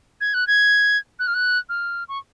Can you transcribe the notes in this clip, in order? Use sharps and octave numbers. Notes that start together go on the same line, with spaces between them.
G#6
F#6
G#6
F#6
F6
F#6
F6
C#6